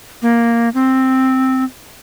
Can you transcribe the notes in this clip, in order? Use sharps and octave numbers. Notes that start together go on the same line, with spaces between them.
A#3
C4